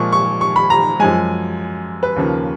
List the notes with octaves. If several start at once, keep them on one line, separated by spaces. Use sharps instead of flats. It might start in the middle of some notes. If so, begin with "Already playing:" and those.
Already playing: A#2 F3 G#3 C#6
C#6
C#6
B5
A#5
F#2 F3 G#3 G#5
B4
D#2 C#3 F3 A#3